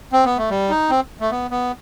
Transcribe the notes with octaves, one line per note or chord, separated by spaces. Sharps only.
C4
B3
A3
G3
D#4
C4
A3
B3
B3